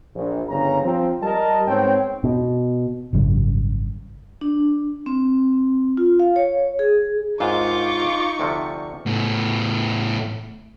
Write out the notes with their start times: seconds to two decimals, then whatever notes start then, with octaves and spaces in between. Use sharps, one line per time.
0.15 A#1
0.48 G1 C#3 A#5
0.82 F3 C4
1.22 G3 A#4 D#5 A5
1.67 G#2 B3 C4 C#5 G5
2.24 B2
3.13 G#1 F#2 C#3 G3
4.41 D4
5.06 C4
5.97 F4
6.19 F5
6.36 C#5
6.79 G#4
7.40 G#1 D#2 G#2 D#4 F4 C#6 D6
8.40 D2 C3 F3
9.06 A2 B3